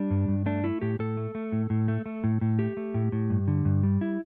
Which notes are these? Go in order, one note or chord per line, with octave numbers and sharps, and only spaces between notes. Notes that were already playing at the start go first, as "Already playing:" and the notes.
Already playing: G3 D4
G2
G2
A3 D4
A3 E4
A2 G4
A2 A4
A3
A3
A2
A2
A3
A3
A2
A2
A3 G4
A3
A2
A2
G2
D3
G2
G3
E4